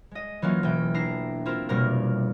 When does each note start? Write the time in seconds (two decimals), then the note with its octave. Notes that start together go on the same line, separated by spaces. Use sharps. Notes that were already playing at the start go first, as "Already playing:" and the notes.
0.11 G#3 D#5
0.42 E3 F#3 A#3 C#4 F4
0.63 E1 E3 G5
0.94 D4 E4 A#5 C7
1.46 C4 E4 F4 A#4
1.69 F1 B2 G3 A#3 A#4 F6